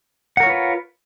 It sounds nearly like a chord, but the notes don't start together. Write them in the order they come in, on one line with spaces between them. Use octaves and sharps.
F#5 A#4 C#5 F4 B4